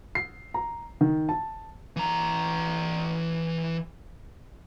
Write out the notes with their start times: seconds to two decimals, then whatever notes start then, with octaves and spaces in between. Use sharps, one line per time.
0.15 C7
0.54 A#5
1.01 D#3
1.29 A5
1.96 E3 A#5